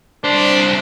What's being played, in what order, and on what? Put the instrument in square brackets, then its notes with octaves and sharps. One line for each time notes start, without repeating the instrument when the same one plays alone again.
[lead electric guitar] G3 C5 [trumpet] D4